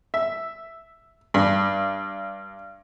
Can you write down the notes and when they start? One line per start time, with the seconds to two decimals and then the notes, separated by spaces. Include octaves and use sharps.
0.14 E5
1.34 G2